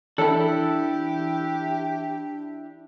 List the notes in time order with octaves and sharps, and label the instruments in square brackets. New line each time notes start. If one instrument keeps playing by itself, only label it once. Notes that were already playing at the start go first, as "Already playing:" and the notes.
[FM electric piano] E3 [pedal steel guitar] D4 E4 [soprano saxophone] G4 [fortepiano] A4